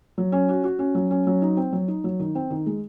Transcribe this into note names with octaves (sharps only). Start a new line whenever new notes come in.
F#3
C#4
F#4
F#4
C#4
F#3
C#4
F#3
D#4
C4
F#3
D#4
F#3
D#3
C4
D#3
G#3